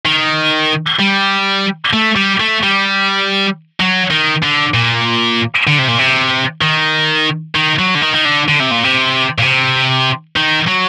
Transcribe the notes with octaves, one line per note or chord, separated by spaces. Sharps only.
D#3
G3
A3
G3
A3
G3
F#3
D#3
D3
A#2
D3
C3
A#2
C3
D#3
D#3
F#3
D3
D#3
D#3
D3
D3
C3
A#2
C3
A#2
C3
D#3
F#3